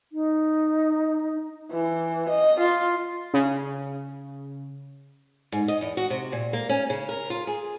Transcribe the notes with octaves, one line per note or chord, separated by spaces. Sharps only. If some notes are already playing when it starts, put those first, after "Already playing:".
D#4
E3
D#5
F4
C#3
G#2
D#5
E2
F#4
C3
A#2
A#3
C#4
C#3
A#4
F4
G#4